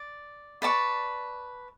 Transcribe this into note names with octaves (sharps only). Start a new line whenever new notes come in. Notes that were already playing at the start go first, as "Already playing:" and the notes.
Already playing: D5
B4 D5 A5 C#6